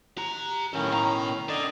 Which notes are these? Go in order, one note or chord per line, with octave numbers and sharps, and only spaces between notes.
G4 A#5
A2 D#3 C#4 A4 F5
B2 A#5
D3 D5 D#5